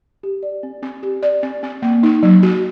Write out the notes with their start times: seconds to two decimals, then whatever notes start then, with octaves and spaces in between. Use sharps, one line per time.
0.23 G4
0.43 D5
0.63 C4
0.83 C4
1.03 G4
1.23 D5
1.43 C4
1.63 C4
1.82 A#3
2.03 D#4
2.23 F#3
2.43 F#4